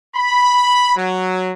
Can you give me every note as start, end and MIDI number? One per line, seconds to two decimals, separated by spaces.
0.16 0.94 83
0.96 1.52 54